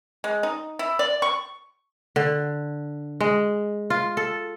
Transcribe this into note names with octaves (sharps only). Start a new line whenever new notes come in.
G#3
D#4
E4
D5
C#6
D3
G#3
F4
A4